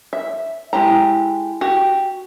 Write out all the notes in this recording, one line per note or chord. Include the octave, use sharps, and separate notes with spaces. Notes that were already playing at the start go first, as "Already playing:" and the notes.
E5
G#3 E4 G4 A#5
F#4 G4